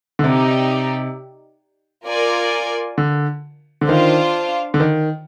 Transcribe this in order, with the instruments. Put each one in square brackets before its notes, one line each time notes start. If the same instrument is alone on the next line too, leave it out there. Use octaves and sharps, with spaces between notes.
[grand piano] D3
[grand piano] C3 [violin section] D#4 G4 D5
[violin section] F4 A#4 D5 G#5
[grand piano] D3
D3
[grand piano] D#3 [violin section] D4 F4 C5 F5
[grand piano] D3
D#3